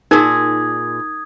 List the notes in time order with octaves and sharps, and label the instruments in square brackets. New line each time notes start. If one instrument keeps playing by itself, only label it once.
[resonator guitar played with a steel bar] A#2 G#4 [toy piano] D#4 A#4 [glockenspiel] D#6 G#6